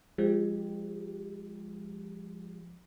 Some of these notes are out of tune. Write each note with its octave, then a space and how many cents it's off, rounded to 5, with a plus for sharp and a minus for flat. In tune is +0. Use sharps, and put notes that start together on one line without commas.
F3 +0 G#3 -25 G4 +5